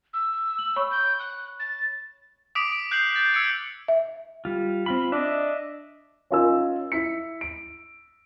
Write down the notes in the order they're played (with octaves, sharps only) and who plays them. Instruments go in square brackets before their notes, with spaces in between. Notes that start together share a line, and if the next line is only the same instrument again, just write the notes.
[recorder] E6
[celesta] F#7
C#5 B5 C#6
[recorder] G6
F#6
A6
[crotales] D6 D#6 B6 D7 F7
D7
F#6 G6 C7 D7 F#7
A6
E6 G#6 C#7 D7
[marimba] E5
[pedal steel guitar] G3 F4
C4 F4 B5
[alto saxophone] D4 [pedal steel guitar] D#5 E5
[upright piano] C#4 D#4 F4 A#4 G#5 E6
E4 B6 C#7
D7